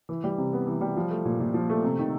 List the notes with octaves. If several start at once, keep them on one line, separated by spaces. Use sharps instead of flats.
E3
G3
C3
B3
E3
G3
F3
A3
A#2
A#2
F3
A3
C3
D#3